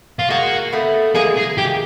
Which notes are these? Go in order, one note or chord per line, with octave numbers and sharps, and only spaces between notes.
F4
G#3 A#3 F#4
A3 B3
G#3 A#3 G#4
G#4
G4